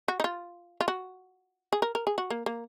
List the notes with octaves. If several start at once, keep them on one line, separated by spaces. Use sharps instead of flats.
F#4
D#4
F4
F4
F#4
G#4
A#4
A#4
G#4
F#4
A#3
A#3